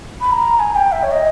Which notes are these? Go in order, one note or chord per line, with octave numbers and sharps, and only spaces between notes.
B5
A#5
G#5
G#5
G5
E5
C#5
D#5